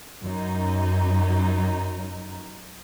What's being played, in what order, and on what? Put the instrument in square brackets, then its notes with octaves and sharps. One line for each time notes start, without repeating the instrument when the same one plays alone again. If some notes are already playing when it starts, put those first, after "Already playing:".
[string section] F#2 D#4